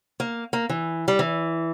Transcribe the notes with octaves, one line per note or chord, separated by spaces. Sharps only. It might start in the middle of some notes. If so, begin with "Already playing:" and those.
A#3
A#3
E3
G3
E3